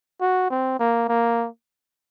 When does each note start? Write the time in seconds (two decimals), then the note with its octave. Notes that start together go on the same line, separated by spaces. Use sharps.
0.21 F#4
0.51 C4
0.80 A#3
1.09 A#3